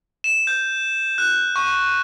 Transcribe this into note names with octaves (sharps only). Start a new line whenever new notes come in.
E7
G6
F#6
C#6